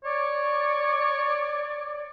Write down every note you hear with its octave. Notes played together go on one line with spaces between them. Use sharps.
C#5 D5